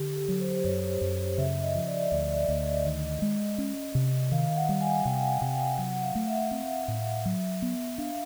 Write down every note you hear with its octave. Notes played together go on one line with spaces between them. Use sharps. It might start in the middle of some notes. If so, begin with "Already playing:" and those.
Already playing: D3 G4
A4
F#3
C5
F#2 C#5
F#2
C#3 E5
D#5
F3
D5
D2 D5
D2 D#5
D#3
G#3
C#4
C3
D#3 F5
F#5
G3
G#5
C3 G5
C3 G5
F#3 F#5
F5
A3
E5
C4
A2
F#3
B3
D4 F5